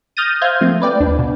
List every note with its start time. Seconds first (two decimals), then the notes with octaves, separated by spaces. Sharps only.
0.17 D#6 F6 G6 A6 A#6 D#7
0.41 C5 E5 F5 F6 G6 G#6
0.61 F3 A3 A#3 C4
0.82 B4 D5 G5
1.00 D#2 D4
1.19 B2